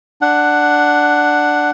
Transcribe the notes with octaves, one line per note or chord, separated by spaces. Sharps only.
D4 F#5